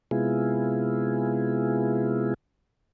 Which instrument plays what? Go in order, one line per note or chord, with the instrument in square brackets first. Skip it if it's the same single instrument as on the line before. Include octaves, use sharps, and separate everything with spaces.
[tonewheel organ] C3 G#3 B3 E4 F4 G#4